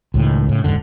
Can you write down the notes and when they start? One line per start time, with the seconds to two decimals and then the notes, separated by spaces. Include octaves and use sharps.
0.14 C#2 A2 D#3
0.49 A2 C#3
0.64 D#1 F2 G#2 D3